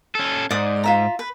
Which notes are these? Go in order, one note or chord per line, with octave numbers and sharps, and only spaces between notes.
C#4 A4
G#2 D5 D#6
F4 E5 A#5
B4